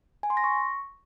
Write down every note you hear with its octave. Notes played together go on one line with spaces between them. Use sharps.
G#5
C6
A#6
C#6